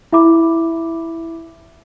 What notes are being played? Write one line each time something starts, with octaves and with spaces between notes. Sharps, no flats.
E4 E5 B5 D6